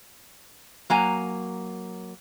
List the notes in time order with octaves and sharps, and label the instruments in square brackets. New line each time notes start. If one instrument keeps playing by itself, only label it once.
[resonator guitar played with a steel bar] F#3 A#3 G#5 A#5